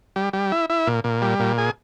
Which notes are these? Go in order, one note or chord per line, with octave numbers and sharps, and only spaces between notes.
G3
G3
E4
E4
A#2
A#2
G3
A#2
G#4